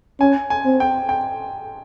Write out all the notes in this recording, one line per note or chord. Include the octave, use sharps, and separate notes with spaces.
C#4 G#5
G#5
C4
G5
G5